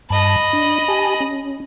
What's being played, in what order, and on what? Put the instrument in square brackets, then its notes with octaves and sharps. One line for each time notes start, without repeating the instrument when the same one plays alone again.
[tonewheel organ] G2 A5 [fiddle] D#5 B5
[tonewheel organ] D4
G4 G#5 A5
C#4